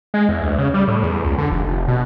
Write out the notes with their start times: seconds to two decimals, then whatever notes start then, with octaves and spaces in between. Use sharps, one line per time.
0.14 G#3
0.29 E2
0.41 D2
0.58 C#3
0.74 G3
0.88 A2
1.03 E2
1.24 C#2
1.38 D3
1.51 F1
1.67 F1
1.88 B2